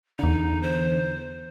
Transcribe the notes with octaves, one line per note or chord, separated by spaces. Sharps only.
E2 D3 D#4
C5